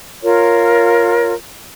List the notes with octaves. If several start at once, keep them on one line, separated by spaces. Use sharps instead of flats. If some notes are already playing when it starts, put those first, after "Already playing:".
F4 A#4 C#5